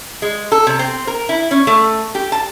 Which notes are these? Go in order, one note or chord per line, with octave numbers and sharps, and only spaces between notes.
G#3
A4
C3
C4
A#4
E4
C#4
A3
G4
A5